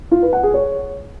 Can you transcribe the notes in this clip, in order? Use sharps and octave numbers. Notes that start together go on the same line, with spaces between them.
F4
B4
F#5
G#4
C#5